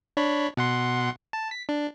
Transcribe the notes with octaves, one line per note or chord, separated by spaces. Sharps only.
D4 C#5 B5
B2 F#5 C6
A5
B6
D4